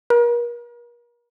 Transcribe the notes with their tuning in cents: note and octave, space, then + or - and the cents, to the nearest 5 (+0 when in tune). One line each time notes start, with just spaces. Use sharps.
A#4 +40